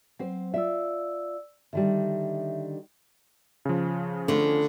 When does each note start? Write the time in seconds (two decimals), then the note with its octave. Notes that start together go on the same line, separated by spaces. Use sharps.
0.19 F#3 C4 C5
0.54 F4 D5 E5 E6
1.73 D3 D#3 G3 E5
3.65 C#3 F3
4.28 D3 A3